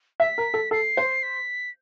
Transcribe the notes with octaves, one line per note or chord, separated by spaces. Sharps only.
E5 B6
A#4
A4
A4 C7
C5
B6